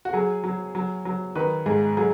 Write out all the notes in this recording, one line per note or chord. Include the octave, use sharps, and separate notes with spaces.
F#4
F#3 G#4
F#3
F#3
F#3
D#3 B4
G#2 G#4
F#3 G#4